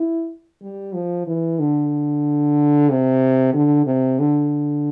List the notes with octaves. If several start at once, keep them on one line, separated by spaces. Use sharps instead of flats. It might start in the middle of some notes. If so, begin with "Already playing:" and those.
Already playing: E4
G3
F3
E3
D3
C3
D3
C3
D3